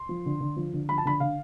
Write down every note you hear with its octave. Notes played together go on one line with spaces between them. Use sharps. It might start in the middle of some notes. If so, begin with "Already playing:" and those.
Already playing: C6
F3
D3
D3
F3
D3
F3 B5
A5
D3 B5
D3 F5